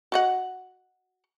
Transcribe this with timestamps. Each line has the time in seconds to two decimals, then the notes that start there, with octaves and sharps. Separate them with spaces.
0.12 F#4 D#5 F#5